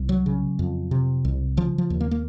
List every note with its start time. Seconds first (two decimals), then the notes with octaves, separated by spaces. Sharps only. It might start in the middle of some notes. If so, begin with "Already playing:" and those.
Already playing: C2
0.09 F#3
0.26 C#3
0.59 F2
0.91 C3
1.25 C2
1.57 C#3 F3
1.78 F3
1.90 D#2
2.00 A#3
2.11 A#3